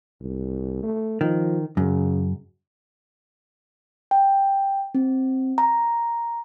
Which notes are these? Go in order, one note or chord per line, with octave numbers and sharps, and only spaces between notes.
C2
A3
D#3 F3
F#2 C#3
G5
C4
A#5